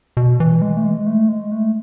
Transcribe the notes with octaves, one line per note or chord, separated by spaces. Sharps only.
B2
E3
G#3
A3
G#3
A3
G#3
A3